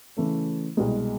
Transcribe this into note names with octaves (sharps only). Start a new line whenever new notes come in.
C#3 E3 A3 C#4
C2 B2 G#3